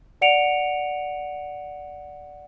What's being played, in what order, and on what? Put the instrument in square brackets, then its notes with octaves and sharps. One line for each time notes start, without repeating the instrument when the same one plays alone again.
[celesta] D5 F#5 C#7 D7 F7